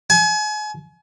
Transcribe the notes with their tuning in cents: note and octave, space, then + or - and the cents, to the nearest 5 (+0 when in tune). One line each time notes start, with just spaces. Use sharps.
G#5 +35